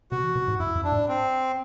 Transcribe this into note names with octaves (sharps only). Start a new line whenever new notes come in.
C3 F#4
E3
C3
A2
G2 E4
F#2
D4
A2
C4